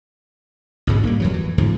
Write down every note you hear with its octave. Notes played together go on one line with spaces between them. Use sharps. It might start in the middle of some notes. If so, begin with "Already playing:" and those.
A1 G#2 C#3 G#3
G3 A#3 C#4
F2 E3 F#3
E3
E2 G#2 D3 F3